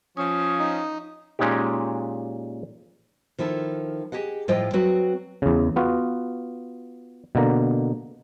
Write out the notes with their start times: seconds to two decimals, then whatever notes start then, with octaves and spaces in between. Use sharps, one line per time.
0.17 F3 C#4 D#6
0.59 D#4
1.39 A#2 G#3 C#4 D#4 G4
3.39 D#3 F3 E4 A4
4.12 G4 G#4 D#5 F#5
4.48 A2 F3 F4 C5 D#5 G5
4.73 F#3 C4 F#4 B4
5.42 E2 C#3
5.76 B3 F4 F#4
7.35 B2 D3 A#3 A#5